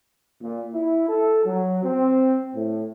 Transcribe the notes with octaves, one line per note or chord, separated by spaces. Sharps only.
A#2
E4
A4
F#3
C4
A2